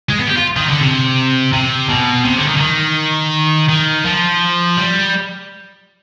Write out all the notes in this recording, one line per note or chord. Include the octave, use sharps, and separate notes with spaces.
G#3
B3
G4
F4
D#3
D3
C3
C3
B2
C3
D3
D#3
D3
D#3
D#3
F3
G3